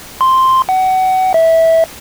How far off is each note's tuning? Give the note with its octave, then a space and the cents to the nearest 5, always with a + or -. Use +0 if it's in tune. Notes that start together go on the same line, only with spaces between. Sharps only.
C6 +0
F#5 +25
E5 -15